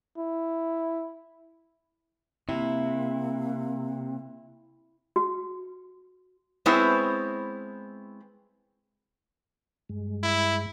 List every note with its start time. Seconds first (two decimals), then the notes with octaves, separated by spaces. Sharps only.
0.18 E4
2.49 C3 A#3 E4
5.16 F#4
6.66 G#3 B3 C4 E4 C#5
9.89 G2 G#3
10.23 E4